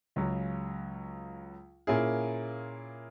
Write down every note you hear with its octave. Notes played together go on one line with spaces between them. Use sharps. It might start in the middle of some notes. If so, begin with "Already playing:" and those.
C#2 C#3 F#3
A#2 A#3 C#4 E4 G#4